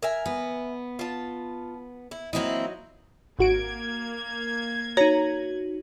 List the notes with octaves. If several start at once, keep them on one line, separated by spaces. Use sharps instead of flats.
A#4 E5 G#5
B3
F4 A5
E4
F#3 A#3 C4 D#4 E4
G#1 A#3 F#4 G#6 D7
D#4 F#4 C#5 A#5